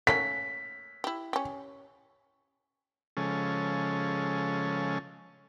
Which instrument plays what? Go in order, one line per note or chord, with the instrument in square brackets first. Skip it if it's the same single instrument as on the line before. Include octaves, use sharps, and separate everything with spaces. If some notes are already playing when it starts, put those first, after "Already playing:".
[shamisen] A3 A#3 C#4 [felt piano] B6
[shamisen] E4 G4
C#4 G4
[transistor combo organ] C#3 F3 G#3 C#4 A4